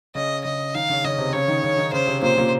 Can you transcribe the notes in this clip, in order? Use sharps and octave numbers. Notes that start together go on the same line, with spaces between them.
C#3 C#4 D#5
C#3 C#4 D#5
D#3 D#4 F5
C#3 C#4
C#3 C#4 D#5
C3 C4
C4
C#3 C#4 C#5
D#3 D#4
C#3 C#4
D#3 D#4
C#3 C#4 C5
C3 C4
A#2 A#3 C5
A#2 A#3